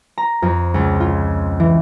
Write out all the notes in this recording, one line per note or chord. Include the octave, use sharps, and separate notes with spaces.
A#5
F2
C#2
F4
E3